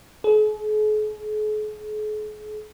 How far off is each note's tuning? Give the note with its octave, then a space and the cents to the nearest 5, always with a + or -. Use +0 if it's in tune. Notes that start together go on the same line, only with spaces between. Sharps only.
G#4 +45